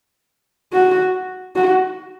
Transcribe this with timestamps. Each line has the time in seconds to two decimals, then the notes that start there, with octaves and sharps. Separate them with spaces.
0.73 F#4
1.56 F#4